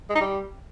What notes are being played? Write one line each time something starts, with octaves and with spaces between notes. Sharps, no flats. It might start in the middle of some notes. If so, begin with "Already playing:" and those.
G#3
D#4
G3